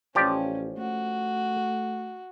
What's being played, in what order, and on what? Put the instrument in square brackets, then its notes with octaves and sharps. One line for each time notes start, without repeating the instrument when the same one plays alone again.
[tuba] A1 [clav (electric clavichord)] F3 G4 D5 [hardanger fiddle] C#4
[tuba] A3 [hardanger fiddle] F#4